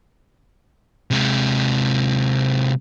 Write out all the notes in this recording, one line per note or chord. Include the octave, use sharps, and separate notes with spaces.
C3 G#3